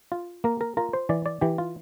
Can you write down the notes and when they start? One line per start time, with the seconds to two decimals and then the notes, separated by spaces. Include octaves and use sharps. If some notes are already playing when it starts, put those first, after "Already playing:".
0.12 F4
0.44 A#3 A#4
0.61 A#4
0.77 F4 A#4
0.93 C5
1.09 E3 D5
1.26 D5
1.41 E3 G4
1.58 F4